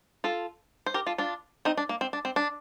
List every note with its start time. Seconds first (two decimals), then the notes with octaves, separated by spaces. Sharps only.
0.24 F4 A4
0.86 C5
0.94 G4 A#4
1.06 F4 A4
1.18 D4 F4
1.65 C4 D#4
1.77 D4
1.89 A#3
2.01 C4
2.13 D4
2.25 C4
2.36 D4